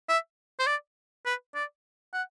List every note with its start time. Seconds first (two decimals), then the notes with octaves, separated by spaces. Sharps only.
0.09 E5
0.59 C5
0.67 D5
1.25 B4
1.55 D5
2.13 F#5